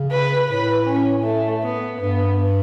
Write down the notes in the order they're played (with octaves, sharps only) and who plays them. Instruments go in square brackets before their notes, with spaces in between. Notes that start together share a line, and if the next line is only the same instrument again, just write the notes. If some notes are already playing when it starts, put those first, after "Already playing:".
Already playing: [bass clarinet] C#3
[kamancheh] B4
[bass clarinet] A2 [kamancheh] B4
[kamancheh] C#4
A3
B3
[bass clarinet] G2 [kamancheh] B3